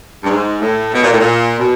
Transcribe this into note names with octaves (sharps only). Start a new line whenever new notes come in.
G2
G#2
A2
B2
A#2
A2
A#2
B2